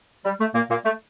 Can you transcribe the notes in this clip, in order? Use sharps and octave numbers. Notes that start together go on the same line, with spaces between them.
G3
A3
A#2 A#3
A#2 A#3
A3